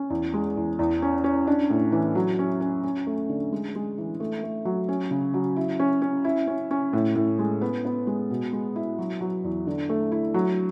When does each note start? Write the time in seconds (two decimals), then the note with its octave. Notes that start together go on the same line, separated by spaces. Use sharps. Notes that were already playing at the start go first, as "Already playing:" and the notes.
Already playing: C#4
0.10 E2
0.34 G#3
0.57 E2
0.79 E2
1.02 C#4
1.24 C#4
1.47 D4
1.70 A2
1.92 E3
2.15 F#3
2.39 C#4
2.61 C#4
2.84 C#4
3.07 A3
3.29 D3
3.52 G#3
3.75 G#3
3.98 E3
4.20 A3
4.43 A3
4.65 F#3
4.88 C#4
5.11 C#3
5.34 F#3
5.56 E4
5.79 C#4
6.02 C#4
6.24 E4
6.47 C#4
6.71 C#4
6.93 A2
7.16 A2
7.39 G#3
7.61 B3
7.85 B3
8.07 G#3
8.30 B2
8.53 G#3
8.76 E4
8.98 F#3
9.21 F#3
9.44 E2
9.67 D3
9.89 A3
10.12 E4
10.34 F#3